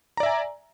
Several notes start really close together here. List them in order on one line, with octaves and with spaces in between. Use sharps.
A#5 D5 E5 G#5